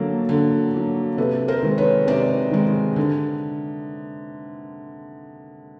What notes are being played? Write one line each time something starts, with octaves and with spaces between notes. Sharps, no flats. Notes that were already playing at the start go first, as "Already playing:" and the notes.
Already playing: D3 F#3 A#3 A4
D3
F#3 A#3
C3 A4 B4
A#4 C5
D#3 G#3
B4 C#5
C3 C5 D5
D#3 G#3
D3